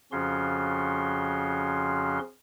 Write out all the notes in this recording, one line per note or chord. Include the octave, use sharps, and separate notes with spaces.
F2 C#3 F3 C#4 F#4 C6